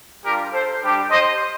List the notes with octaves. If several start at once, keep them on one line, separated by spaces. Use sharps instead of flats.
G3 D4 F4 G4 A#4
A4 C5
G3 D4 G4
C5 D#5